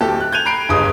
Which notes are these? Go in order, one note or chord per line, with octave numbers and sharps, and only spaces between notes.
D1 G4 A4
F#6
G6 G#6 D#7 F7
A#5 B5 G6 C7 D7
G1 C#2 G2 G#3 D#6